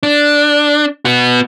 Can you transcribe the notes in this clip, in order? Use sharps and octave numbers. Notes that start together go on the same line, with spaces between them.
D4
B3 F#4